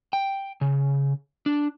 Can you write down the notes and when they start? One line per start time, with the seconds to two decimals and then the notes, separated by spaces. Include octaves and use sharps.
0.13 G5
0.61 C#3
1.46 D4